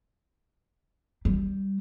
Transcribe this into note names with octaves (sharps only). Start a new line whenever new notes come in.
G3